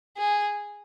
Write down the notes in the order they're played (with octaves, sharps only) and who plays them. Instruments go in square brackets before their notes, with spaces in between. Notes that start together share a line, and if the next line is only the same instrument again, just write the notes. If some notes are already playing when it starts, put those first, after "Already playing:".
[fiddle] G#4